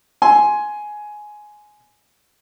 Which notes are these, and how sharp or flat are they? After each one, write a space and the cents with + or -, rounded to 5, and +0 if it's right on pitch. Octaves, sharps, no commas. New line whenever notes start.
G#5 +10 C6 +0